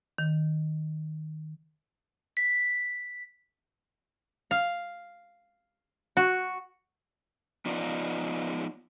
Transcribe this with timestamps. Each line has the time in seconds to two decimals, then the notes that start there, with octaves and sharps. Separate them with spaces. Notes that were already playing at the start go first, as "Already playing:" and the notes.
0.18 D#3
2.37 B6
4.51 F5
6.17 F#4
7.66 F3 B3 D#4 F4 D5